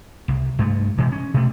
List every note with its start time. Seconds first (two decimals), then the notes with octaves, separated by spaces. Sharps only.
0.28 C2
0.59 G2 A3
0.98 G2 B2 E3 G#3
1.12 C#4
1.34 B2 A3